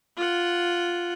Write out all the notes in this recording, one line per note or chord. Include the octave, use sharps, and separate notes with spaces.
F4 F#5